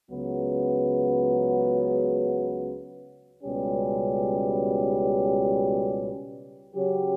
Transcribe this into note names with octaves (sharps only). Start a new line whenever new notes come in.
C#2 C#3 F#3 B3
C#2 B2 G3 C#4 G4
C#3 F#3 C#4 G4